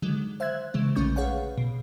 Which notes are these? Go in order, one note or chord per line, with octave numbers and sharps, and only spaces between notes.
D3 D#3 F#3 G#3
C5 E5 E6 F#6 G#6
C#3 E3 G#3
A#1 D3 A3 C#4 C#6 G6
G#4 B4 C#5 F5 F#5
B2